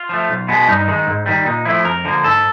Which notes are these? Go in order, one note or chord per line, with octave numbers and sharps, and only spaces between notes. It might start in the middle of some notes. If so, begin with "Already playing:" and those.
Already playing: F4
F3 A3
B1
B2 G#3 B3
G2 D#4
D#3 G#3
G#2
D#3 G3
A#2 D#4
F3 A3 E4
F2 A#4
D3 F3 A#3
G#2 A4